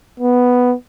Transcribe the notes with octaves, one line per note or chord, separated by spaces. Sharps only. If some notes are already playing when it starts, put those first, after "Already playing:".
B3